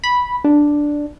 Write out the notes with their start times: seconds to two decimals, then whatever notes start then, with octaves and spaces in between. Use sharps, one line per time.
0.04 B5
0.44 D4